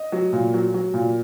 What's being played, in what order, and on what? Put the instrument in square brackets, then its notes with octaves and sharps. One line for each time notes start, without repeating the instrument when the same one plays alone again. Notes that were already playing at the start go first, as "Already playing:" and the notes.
Already playing: [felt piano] D#5
F#3
A#2
F#3
F#3
A#2